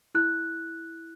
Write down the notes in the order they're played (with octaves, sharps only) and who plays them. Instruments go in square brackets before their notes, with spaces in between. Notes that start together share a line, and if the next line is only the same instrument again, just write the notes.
[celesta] E4 F#6